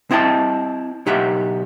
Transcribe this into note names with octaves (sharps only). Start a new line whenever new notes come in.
C4 E4 D#5 G5 A5
B1 D#4 G4 E5 F#5